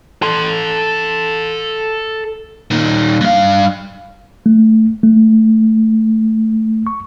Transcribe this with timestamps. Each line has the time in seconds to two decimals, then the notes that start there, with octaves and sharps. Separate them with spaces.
0.23 A4 C6
2.71 A#2 D#3
3.21 G2 F5
4.46 A3
5.03 A3
6.87 C#6